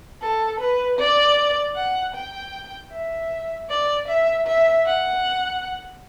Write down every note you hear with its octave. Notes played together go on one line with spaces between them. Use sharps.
A4
B4
D5
F#5
G5
E5
D5
E5
E5
F#5